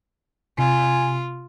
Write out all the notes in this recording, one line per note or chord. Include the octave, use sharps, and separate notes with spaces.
C3 F4 G#5